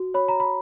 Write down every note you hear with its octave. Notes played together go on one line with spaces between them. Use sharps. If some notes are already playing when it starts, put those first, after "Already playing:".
Already playing: F#4
C#5 B5
A#5
B5